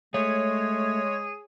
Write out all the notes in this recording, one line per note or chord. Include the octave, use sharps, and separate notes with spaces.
G#3 A3 G#4 C#5